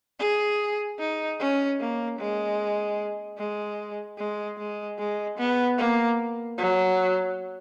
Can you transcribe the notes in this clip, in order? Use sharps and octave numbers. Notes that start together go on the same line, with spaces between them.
G#4
D#4
C#4
A#3
G#3
G#3
G#3
G#3
G#3
B3
A#3
F#3